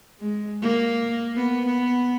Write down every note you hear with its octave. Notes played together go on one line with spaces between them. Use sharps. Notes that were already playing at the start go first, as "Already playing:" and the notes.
G#3
A#3
B3
B3